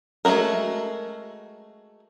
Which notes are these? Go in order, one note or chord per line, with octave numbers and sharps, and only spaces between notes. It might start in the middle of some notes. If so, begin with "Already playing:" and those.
G#3 A3 D#4 F#4 A#4